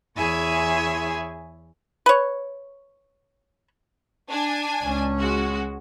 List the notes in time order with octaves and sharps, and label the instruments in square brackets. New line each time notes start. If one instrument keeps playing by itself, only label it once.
[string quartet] E2 E4 G#4 C#5 E5 G#5
[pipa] B4 C#5
[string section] D4 G#5
[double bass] C#2 C#4
[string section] G#3 F#4